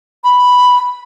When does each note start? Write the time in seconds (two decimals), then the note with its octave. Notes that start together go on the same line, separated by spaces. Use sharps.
0.24 B5